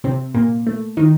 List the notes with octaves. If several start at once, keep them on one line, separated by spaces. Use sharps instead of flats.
C3 C4
A#2 A#3
A3
D#3 D#4